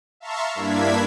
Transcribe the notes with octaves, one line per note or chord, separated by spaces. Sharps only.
E5 F5 A5 A#5 C6 C#6
G2 A#3 D4 E4 G#6 B6